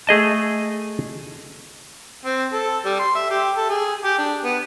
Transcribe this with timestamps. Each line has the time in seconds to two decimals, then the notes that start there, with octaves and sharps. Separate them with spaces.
0.07 A3 G#4 D#5 A5
2.26 C4
2.53 A4
2.85 G3
2.99 C6
3.16 E5
3.31 G4
3.57 A4
3.70 G#4
4.04 G4
4.18 D4
4.44 B3